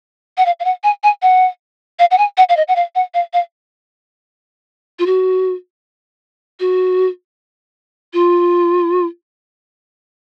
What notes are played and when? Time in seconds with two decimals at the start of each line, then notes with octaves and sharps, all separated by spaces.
0.38 F#5
0.46 F5
0.60 F5
0.65 F#5
0.84 G#5
1.03 G#5
1.22 F#5
1.99 F5
2.11 F#5
2.18 G#5
2.38 F#5
2.49 F5
2.57 D#5
2.68 F#5
2.76 F5
2.95 F#5
3.14 F5
3.33 F5
4.99 F4
5.06 F#4
6.60 F#4
8.14 F4